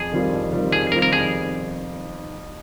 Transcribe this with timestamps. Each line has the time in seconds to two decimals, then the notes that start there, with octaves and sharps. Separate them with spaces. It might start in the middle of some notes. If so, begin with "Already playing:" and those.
Already playing: F2 G#4
0.12 D#3 G3 C4 F4
0.33 F2
0.52 D#3 G3 C4 F4
0.72 F2 G#4
0.92 D#3 G3 C4 F4 A#4
1.02 A#4
1.12 F2 G#4